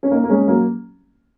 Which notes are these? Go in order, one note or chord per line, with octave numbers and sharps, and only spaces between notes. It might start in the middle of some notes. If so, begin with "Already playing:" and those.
C#4
A#3 D#4
A#3
G#3 C#4
F#3 A#3